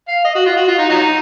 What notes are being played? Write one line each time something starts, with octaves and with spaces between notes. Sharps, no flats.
F5
D#5
F#4
F4
F#4
F4
D#4
F#3 D#4